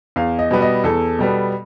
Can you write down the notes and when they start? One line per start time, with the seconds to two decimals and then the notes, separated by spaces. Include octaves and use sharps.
0.16 E2 F5
0.39 D#5
0.51 B2 G3 B3
0.62 D#5
0.84 E2 A4
1.19 B2 G3 B3